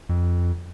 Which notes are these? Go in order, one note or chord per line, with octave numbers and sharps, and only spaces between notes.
F2